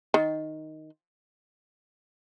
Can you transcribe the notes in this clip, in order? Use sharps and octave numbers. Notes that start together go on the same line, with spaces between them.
D#3